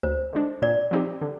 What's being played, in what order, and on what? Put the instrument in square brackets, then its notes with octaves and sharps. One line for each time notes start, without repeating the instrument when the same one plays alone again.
[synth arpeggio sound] D2 [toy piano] C5
[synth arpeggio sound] D3 G#3 D4
[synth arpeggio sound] A#2 [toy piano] D5
[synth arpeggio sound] F3 C4 D#4 G4
D3